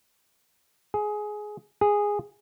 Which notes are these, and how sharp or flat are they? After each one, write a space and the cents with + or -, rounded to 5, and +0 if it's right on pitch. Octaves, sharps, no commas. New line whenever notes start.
G#4 +15
G#4 -10